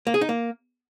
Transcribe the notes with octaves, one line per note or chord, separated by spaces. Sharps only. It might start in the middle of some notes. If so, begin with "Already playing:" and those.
A#3
G#4
D#4
A#3